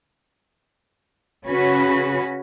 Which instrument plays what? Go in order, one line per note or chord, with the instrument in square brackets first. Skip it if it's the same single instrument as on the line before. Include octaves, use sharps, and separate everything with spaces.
[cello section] C#3 C#4 F#4 B4